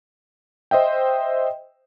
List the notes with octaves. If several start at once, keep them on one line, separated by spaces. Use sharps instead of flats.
C5 D#5 E5 G5